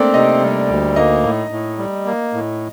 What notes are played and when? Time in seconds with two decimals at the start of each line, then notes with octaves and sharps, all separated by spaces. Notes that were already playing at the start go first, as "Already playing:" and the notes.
Already playing: A3 A#3 C4 D4 A4 A#4 D5
0.14 C3 D#4 D#5
0.42 G3
0.69 D2
0.96 A#3 D#4 D#5
1.23 A2
1.51 A2
1.78 G3
2.06 A#3
2.33 A2